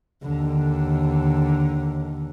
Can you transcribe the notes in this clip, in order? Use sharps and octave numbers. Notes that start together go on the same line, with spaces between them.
D#2 D3